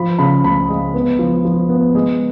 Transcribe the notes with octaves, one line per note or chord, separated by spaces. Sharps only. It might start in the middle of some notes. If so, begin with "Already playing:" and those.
Already playing: F3 B5
C#3 B5
C#2 B5
G#3
B3
F3
F3
B3
G#3